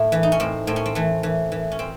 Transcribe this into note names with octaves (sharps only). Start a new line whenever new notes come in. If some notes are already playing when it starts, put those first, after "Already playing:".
Already playing: A2 E4
E3
D#4
C#4
A2 C4
A2 C4
C#4
C4
E3 A3
E3
E3
C#4
C4